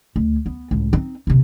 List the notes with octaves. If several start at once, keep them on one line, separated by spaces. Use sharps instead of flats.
D2
B3
C#2 A2
C4 D#4
D#1 C3